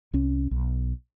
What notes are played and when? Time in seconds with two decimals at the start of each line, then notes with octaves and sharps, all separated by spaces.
0.13 C2 C#4
0.51 B1